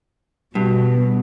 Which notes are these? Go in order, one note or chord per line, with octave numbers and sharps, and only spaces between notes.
G2 B2